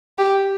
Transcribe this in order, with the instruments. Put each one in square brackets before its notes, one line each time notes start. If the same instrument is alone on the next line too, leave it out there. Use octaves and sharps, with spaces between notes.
[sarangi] G4